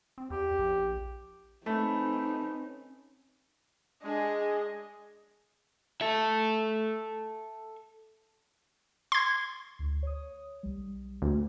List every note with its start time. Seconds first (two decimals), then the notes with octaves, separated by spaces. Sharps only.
0.18 C4
0.30 E2 G4
0.59 A#1
1.66 A3 C4 C#4 D#4 B4
4.03 G#3 D4 G#4 D#5
6.01 A4 E5
9.12 C6 G#6
9.79 D2
10.03 C#5 D#6
10.63 B1 G3
11.22 D2